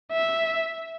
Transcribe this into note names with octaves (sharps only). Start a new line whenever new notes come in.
E5